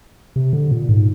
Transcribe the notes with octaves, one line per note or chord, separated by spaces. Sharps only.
C3
D3
A#2
G#2